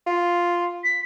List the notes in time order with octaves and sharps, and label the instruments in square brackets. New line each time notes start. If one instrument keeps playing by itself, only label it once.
[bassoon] F4
[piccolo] B6